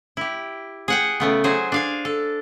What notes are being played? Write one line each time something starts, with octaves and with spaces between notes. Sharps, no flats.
E4 G4
G#4 F#5 G5
C#3 A3 B3
F#3 G#4 C5
D4 F5 G#5
A4